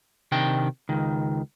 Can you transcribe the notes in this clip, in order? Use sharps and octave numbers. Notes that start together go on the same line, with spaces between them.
C3 D#3 D4 G5
C#2 D#3